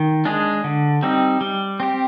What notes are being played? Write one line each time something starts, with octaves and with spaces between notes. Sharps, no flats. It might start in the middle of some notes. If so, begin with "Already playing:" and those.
Already playing: D#3
G#3 D4 G#4
D3
G3 C4 D#4
G3
C4 G4